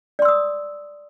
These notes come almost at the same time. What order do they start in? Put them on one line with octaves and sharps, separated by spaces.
D5 C6 E6 D#6